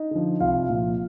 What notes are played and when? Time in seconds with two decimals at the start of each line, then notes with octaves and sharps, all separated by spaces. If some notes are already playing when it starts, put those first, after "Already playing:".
Already playing: D#4 D#5
0.11 D3 F3
0.40 C2 F4 F5
0.69 A#2 F3